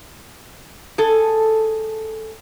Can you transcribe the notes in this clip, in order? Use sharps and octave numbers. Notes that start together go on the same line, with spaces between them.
G#4 A4